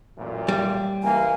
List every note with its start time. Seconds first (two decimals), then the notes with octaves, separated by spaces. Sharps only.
0.17 A1 F#2 A#2
0.48 G3
1.03 C#2 E3 A#3 G#5